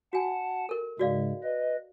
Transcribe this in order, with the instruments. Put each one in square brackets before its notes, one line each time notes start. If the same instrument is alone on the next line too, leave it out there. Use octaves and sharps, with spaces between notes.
[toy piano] F#4 G#5 [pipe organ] F#5 A5
[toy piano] A4 A#4
[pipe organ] G#2 C#3 G#3 [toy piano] F#4 D5 F5
[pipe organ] B4 D#5